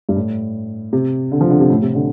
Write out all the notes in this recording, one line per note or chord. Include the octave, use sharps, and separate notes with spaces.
G2
A2
C3
D3
F3
D3
C3
A2
C3
D3